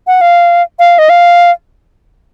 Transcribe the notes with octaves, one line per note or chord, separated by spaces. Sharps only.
F#5
F5
F5
D#5
F5